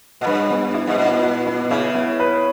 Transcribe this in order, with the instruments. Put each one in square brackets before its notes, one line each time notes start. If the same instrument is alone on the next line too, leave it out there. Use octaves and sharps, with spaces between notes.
[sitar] A#2
[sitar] G2 [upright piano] B4
[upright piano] B3
E4
[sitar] G2
[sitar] A#2 [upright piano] B3
[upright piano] B4
B3
[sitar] C#3 [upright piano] E4
[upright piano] B3
B4